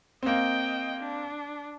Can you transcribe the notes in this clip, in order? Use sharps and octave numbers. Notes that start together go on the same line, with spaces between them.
A#3 C4 D#5 G5
D4